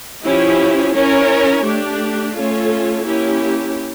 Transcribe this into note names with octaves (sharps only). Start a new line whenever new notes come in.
F3 C#4 E4 G4
C#4 E4 A#4 C#5
A3 D4 G4
A3 C#4 F4 A4 C#5
A#3 C#4 E4 G4